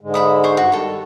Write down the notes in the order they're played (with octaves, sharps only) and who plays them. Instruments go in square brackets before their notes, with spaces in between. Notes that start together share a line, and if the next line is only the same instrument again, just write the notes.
[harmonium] G#2 D3 G#3
[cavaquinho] E5 B5 D#6
C5 G#5 C#6
[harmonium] G2 [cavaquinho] F#4
[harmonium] D#3 G3 [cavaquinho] A4 C#5